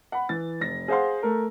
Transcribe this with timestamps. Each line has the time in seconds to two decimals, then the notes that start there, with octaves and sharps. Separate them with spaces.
0.12 F#5 B5
0.29 E3 A6
0.60 F1 A#6
0.88 G#4 C5 F5 F#5 C6
1.23 A3 A#4